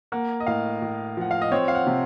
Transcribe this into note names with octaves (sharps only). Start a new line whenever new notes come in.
A#3 F#5
D#5
A2 F5
A2
F3 F#5
F5
D#5
C4 C#5
F5
F#5
C3